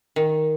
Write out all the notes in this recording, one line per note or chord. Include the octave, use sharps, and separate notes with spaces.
D#3